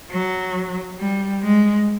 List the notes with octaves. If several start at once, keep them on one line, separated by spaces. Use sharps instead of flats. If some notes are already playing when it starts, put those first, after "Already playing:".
F#3
G3
G#3